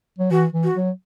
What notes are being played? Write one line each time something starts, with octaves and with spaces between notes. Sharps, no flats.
F#3
E3 F#4
E3
F#4
F#3